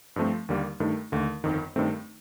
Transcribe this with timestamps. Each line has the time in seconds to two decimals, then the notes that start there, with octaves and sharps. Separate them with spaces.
0.16 G2 F3 A3 C4
0.49 D#2 D3 G3 A#3
0.80 G2 D#3 A3
1.12 D#2 D3 A3
1.44 G1 F2 D#3
1.76 G2 D#3 A3 C4